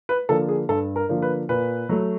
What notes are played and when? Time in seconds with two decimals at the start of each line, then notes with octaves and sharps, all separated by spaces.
0.09 B4
0.29 D3 F3 A#3 A4
0.49 G#4
0.69 G2 A4
0.96 A#4
1.09 D3 F3 A#3
1.22 B4
1.49 A#2 B4
1.89 F#3 A3